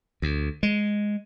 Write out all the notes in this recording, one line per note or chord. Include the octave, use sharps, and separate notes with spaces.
D2
G#3